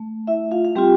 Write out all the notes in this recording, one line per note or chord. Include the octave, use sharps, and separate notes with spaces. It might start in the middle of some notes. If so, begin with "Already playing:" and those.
Already playing: A3
E4 E5
F4 F5
F5
G3 C4 F4 G4 G5